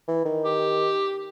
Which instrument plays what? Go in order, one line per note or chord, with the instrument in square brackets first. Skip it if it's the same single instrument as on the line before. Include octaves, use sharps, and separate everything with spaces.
[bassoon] E3
D#3
[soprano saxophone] G4